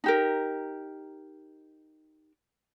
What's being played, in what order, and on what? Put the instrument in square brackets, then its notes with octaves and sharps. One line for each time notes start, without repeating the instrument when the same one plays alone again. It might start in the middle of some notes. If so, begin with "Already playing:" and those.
[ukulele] D#4 G4 A#4